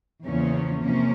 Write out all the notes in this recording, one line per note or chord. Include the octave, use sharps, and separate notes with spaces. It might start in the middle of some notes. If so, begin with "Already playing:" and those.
E2 C#3 F3 A#3 C#4
C3 F3 A#3 C#4